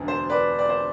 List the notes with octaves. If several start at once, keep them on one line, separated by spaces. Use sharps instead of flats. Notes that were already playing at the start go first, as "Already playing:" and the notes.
Already playing: E1 D2 D3
C5
B4 D5
D5
C5